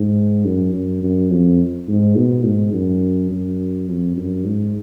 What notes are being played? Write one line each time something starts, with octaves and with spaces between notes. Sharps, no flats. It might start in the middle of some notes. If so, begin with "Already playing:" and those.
Already playing: G#2
F#2
F#2
F#2
F2
G#2
B2
G#2
F#2
F#2
F2
F#2
G#2